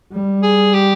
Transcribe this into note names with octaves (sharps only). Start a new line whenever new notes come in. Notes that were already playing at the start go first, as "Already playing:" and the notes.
G3
G#4
G4